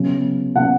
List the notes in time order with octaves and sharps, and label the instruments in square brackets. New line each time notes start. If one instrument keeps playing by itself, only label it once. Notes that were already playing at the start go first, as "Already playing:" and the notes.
Already playing: [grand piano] C#3 F#3 B3
C#3 F#3 B3 F#5